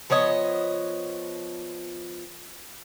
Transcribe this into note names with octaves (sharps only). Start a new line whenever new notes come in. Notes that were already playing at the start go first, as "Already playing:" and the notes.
F3 B3 C#5 D#5